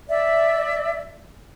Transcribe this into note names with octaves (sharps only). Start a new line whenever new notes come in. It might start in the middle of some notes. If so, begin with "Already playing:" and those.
D5 E5